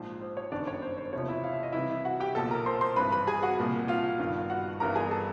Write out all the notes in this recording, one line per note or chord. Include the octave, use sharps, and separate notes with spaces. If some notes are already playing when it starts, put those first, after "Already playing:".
Already playing: A#1 G#2 F3 C5
C5
C#5
G1 F#2 D#3 D4 D5
C#5
C5
C5
F#1 E2 C3 F3 C#5
E4 E5
F5
E5
D#5
C2 C3 E3 E4 E5
F#4 F#5
G4 G5
B1 A#2 F3 A4 A5
A#4 A#5
C5 C6
C5 C6
G#1 G2 E3 B4 B5
B4 B5
G#4 G#5
F#4 F#5
C2 A#2 F3
F4 F5
G1 G2 D#3
F#4 F#5
G1 G2 E3 A#4 A#5
G#4 G#5
A4 A5